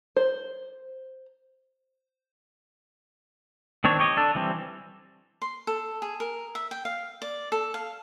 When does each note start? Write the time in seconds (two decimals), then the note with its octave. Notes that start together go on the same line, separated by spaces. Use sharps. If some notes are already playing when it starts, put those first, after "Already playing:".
0.16 C5
3.84 D#3 C4 D4 C#5
4.00 G4 C#5 D#5
4.17 D4 A4
4.35 E3 G3 C4
5.42 C6
5.67 A4
6.02 G#4
6.20 A#4
6.55 E5
6.71 G5
6.85 F5
7.22 D5
7.52 A4
7.74 F5